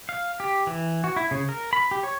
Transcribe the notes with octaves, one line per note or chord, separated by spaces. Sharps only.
F5
G4
E3
F#4
E4
C#3
A#4
B5
G4
C#5